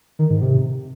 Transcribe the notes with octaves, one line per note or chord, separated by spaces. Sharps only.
D#3
G#2
C3